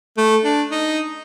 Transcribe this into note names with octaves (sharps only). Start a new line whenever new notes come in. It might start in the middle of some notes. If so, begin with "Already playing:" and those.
A3
D4
D#4